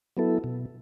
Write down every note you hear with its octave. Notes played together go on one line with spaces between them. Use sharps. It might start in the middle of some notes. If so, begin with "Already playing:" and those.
F#3 B3 E4 A4
B2